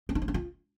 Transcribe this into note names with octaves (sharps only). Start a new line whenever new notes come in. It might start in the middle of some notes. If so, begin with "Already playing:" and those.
C4
D#4
A#3
D4
F4